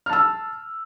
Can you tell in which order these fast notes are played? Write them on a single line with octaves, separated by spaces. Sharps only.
F6 A5 E6